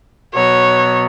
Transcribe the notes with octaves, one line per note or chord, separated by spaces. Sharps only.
B2 F#3 B3 F#4 C#5